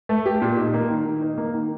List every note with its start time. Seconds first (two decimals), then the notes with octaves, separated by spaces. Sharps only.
0.09 A3
0.26 G4
0.42 A#2
0.57 D#4
0.74 A#3
0.90 D#3
1.06 D#3
1.22 D#4
1.38 A#3
1.54 D#3